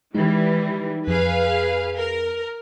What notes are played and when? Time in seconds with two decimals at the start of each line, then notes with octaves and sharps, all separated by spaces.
0.15 E3 G3 G#3 D#4
1.07 F2 G#4 B4 F5
1.98 A#4